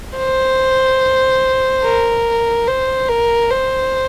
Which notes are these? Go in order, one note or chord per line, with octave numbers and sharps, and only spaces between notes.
C5
A#4
C5
A#4
C5